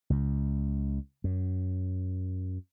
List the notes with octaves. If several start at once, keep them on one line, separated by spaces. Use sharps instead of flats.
C#2
F#2